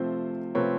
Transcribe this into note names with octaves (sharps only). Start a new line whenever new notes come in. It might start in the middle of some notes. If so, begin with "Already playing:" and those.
Already playing: C3 F3 A3 C4 C5
C3 F3 A3 C4 B4 C#5